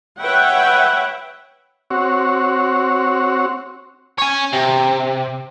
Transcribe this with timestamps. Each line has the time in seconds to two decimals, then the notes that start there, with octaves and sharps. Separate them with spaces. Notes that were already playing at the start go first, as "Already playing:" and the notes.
0.21 B4 C#5 E5 F#5 G5
1.91 C4 F#4 C#5
4.18 C#5 G#5
4.53 C3